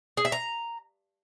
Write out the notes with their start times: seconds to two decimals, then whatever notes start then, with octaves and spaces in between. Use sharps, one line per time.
0.17 G#4
0.25 E5
0.32 A#5